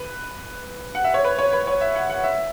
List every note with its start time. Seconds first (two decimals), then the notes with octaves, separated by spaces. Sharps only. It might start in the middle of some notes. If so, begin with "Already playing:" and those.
Already playing: B4
0.95 F#5
1.04 E5
1.14 C#5
1.24 B4
1.39 C#5
1.53 B4
1.67 C#5
1.81 E5
1.95 F#5
2.10 F#5
2.24 E5